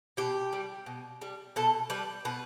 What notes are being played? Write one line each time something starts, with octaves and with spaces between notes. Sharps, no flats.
B2 G4
G3
B2
G3
B2 A4
G3 B4
B2 B4